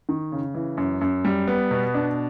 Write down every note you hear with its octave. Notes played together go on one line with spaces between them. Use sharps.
D#3
C#3
E3
F#2
F#2
G3
B3
B2
D4